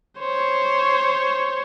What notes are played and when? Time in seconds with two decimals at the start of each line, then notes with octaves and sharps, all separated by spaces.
0.20 C5 C#5